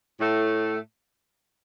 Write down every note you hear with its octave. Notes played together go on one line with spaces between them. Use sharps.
A2 A3